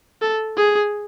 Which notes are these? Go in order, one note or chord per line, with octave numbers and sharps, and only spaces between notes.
A4
G#4